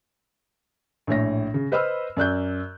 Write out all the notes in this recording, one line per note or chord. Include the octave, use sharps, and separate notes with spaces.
A#1 A2 C#5 A#6
C#3
B4 C5 D#5 B5 E6 F6
F#2 D5 F#6 G6